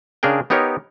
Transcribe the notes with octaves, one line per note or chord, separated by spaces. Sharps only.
C#3 D4 G#4 A#4 G5
B3 D#4 G4 A#4 C#5